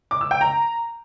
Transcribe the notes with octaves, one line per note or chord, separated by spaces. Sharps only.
D6
E6
G5
A#5